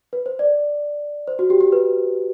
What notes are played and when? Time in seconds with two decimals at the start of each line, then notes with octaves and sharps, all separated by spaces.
0.13 B4
0.26 C5
0.39 D5
1.28 C5
1.39 F#4
1.50 G4
1.61 G4
1.72 B4